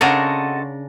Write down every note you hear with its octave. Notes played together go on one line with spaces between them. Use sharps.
C#3 C4 D4 F#4 A4 A#4 D#5 A5